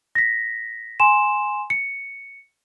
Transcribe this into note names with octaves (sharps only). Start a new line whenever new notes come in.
A#6 B6
G#5 C6 E7
C#7